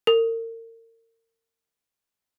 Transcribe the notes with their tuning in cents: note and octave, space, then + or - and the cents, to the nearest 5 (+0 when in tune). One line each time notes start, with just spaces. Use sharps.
A#4 -40